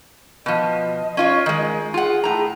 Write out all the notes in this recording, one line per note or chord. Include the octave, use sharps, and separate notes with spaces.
B2 F3 D#5
C#4 F4 C#5
D#3 G#3
F4 G#4 F#5
A2 A#5